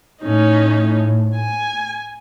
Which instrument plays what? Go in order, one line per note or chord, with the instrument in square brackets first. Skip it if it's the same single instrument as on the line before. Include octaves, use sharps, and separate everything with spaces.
[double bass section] A2 [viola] C#4 D#4
[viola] G#5